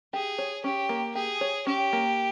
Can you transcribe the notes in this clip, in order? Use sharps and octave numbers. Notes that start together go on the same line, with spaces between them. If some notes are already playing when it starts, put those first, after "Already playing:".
G4 G#4
C#5
C#4 G4
A#3
G4 G#4
C#5
C#4 G4
A#3